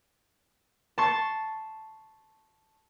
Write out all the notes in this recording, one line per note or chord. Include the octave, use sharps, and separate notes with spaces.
A5 C6 C#6 A6